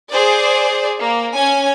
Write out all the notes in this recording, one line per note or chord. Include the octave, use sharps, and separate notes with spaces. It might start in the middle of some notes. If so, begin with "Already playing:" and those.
G#4 C5 D5
A#3
C#4 G#5